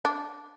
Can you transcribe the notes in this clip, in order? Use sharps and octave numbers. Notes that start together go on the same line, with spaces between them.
D4